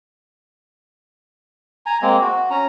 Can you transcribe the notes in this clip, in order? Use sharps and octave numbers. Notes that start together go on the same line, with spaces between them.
G#5 A#5
G#3 A#3 C4
F#4
C#4 A#5